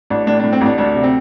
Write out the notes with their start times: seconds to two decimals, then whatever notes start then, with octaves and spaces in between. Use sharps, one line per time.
0.10 A1 D4
0.27 A2 D4
0.40 A2 D4
0.53 C4
0.61 A1 D4
0.78 D2 D4
0.95 C3
1.03 C4